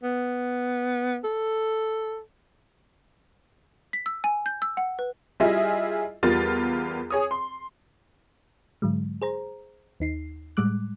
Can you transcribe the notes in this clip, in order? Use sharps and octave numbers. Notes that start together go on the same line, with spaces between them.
B3
A4
B6
E6
G#5
G6
E6
F#5
B4
G3 E4 F4 G#4 D#5 E5
E2 G3 F4 A#4 A6
G#4 C#5 D#6
C6
G#2 D3 F#3 G#3
G#4 C5 A#5
D#2 D#4 C7
A2 G3 G#3 D6 F#6